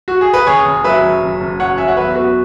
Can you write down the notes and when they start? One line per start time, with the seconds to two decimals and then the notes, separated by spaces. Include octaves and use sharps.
0.08 F#4
0.21 G#4
0.33 B4
0.47 F#1 G#4 C#5
0.65 F#1
0.84 F#3 B4 E5
1.03 F#2
1.22 F#1
1.40 F#1
1.59 F#3 C#5 F#5
1.78 F#2 E5 G#5
1.88 C#5 F#5
1.97 E2 B4 E5
2.15 B3 F#4 B4